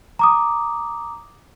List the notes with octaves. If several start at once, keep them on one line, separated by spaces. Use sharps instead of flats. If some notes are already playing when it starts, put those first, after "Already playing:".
A#5 D6 D#6